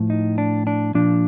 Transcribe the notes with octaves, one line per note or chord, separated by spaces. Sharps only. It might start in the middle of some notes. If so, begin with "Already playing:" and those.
Already playing: A2 F3
D#4
D4
D4
A#2 F3 D4